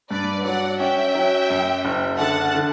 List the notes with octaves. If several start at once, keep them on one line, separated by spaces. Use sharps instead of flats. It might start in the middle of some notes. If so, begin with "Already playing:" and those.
G2 B4 D5
F#3 D5 F#5
C#4 E5 G5
F#3
F#2
F#1
D3 F#5 A5
D3